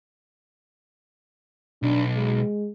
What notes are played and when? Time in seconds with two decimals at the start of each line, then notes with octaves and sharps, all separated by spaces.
1.83 B1 D4
2.16 G#3